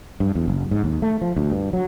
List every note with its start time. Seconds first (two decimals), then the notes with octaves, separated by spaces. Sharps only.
0.20 G2
0.35 E2
0.48 F#1
0.71 G#2
0.84 D#2
1.02 A3
1.21 F3
1.36 D2
1.52 G2
1.73 F#3